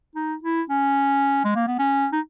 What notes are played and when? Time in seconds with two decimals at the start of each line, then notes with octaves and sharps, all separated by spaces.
0.15 D#4
0.43 E4
0.69 C#4
1.44 G#3
1.55 A#3
1.67 B3
1.79 C#4
2.12 D#4